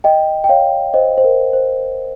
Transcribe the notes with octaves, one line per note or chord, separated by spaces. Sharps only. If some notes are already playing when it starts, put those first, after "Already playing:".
D#5 G5
G5
C#5 F5
C5 D#5
C5
A#4
C5